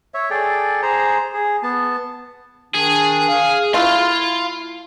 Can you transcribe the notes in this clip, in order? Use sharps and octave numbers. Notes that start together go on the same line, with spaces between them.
C#5 E5
G#4 A4 D5 G5
G#4 C5 A#5
G#4
B3 A5
D#3 D4 G#4
F5
A3 E4 F4 F5 C6